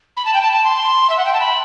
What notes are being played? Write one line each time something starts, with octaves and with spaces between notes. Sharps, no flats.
B5
A5
G5
A5
A5
C6
E5
F#5
G5
A5
B5